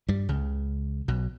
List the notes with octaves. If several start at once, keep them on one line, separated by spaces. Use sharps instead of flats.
G2 G3
C#2 C#3
B1 B2